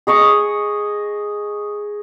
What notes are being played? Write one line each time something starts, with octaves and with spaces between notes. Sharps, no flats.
G#4 D#5 C#6 D#6